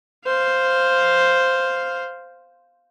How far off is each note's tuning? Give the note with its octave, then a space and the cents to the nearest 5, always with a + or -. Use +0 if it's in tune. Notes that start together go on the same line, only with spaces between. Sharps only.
C5 +0 F5 +0